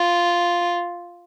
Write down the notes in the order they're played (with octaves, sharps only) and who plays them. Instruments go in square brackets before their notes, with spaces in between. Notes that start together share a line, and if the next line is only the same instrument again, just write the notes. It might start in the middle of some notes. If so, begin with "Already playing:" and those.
Already playing: [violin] F4